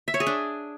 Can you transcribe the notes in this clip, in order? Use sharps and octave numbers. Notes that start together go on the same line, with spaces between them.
E5
C#5
G#4
D4